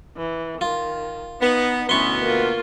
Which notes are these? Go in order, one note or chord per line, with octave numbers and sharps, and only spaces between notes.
E3
D#3 F4
B3 D#4
D2 B2 B3 C#4 E4 C6 C#6
A#3 F4